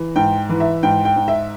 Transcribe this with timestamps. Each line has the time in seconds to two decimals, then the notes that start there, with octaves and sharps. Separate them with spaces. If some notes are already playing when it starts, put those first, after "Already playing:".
Already playing: E3
0.16 G#2 G5
0.49 E3
0.60 E5
0.83 G#2 G5
1.05 G5
1.16 G#2
1.28 E5